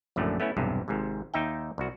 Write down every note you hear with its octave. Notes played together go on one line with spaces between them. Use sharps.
A#1 F#2 A2 D3 A3
A3 B3 C#4 E4
B1 E2 G2 C3
G#1 G#2 C3
D#2 D#4 E5 G5
C2 F#4